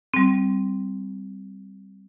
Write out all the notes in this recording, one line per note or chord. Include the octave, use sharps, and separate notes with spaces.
G3 C4